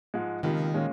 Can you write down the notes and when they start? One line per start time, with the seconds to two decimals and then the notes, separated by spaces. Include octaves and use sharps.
0.14 G#2 F3 G#3
0.43 C#2 C3 D#3 F3 A#3
0.74 A#2 G#3 C#4 F4